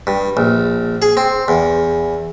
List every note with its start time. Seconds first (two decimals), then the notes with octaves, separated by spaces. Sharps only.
0.07 G2
0.37 A#1
1.02 G#4
1.17 C4
1.48 E2